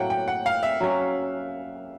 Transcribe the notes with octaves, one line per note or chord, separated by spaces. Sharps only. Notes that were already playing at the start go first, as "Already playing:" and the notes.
Already playing: A2 F#3 A#3 F#5 G5
G5
F#5
F5
E5
F#3 A#3 C#4